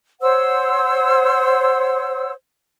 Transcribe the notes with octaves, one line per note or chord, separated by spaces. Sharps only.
C5 C#5 F#5 E6